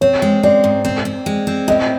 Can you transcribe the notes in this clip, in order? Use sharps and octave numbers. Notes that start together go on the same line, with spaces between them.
C4 C#5
G#3
C4 D5
G#2
C4
C4
G#3
C4
A2 D#5